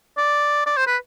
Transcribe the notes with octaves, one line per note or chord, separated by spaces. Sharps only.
D5
D5
C5
B4